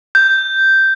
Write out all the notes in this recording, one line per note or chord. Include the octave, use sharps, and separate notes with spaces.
G6